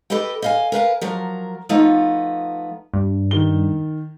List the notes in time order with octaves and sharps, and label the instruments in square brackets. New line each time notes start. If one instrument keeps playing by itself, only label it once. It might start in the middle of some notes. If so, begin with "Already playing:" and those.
[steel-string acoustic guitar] G4 A4 B4 D#5 G5
D#5 F5 G#5
A#4 B4 F5 G#5
F3 F#3 A#4
F3 A3 B3 D#4 F4
[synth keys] G2
[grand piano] D#3 G7